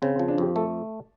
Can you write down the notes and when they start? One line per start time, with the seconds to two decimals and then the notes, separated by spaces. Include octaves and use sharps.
0.02 C#3 C4
0.16 C4
0.19 F3
0.28 D4
0.38 F2 G4
0.56 A3 A4